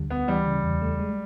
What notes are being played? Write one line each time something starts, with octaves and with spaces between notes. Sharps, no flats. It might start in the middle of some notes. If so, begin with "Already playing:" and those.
Already playing: D2 D3 G3
D2 B3
E3 G3
C#3
E2
A3
G#3